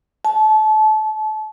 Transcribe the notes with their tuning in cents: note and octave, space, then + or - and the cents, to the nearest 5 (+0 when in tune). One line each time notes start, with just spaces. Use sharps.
A5 -30